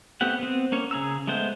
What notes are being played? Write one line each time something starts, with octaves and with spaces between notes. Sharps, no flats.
A3 B3 C4 G4 F#5
B3 C4
A#3 C#4 C#5
C#3 G#4 A#5 E6
G#3 A3 B3 C5